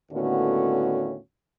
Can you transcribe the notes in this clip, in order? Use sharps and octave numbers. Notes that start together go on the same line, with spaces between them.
D#2 A2 D3 B3 C#4 F#4